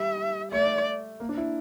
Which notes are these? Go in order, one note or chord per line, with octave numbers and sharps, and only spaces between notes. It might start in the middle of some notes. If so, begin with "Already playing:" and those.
Already playing: G3 E5
A3 D5
A#3
D4
E4